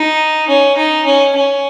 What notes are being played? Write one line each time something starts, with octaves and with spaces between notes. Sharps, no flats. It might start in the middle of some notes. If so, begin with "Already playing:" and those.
Already playing: D#4
C#4
D#4
C#4
C#4